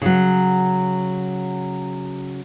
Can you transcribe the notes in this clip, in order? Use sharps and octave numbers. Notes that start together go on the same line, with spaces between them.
C#3 F#3